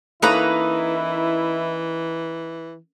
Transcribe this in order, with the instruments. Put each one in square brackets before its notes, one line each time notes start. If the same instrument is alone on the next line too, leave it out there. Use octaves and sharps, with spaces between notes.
[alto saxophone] E3 [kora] A#3 C#4 A4 [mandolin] D#4 B4 A#5 [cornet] E4